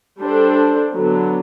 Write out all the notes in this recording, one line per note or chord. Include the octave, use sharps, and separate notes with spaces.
G3 D4 A4 C5
D3 F#3 B3